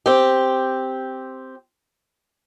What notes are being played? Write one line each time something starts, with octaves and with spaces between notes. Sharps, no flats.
C4 G4